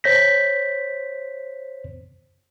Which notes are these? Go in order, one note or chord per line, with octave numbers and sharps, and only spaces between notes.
C5 C#5 G6 A#6 B6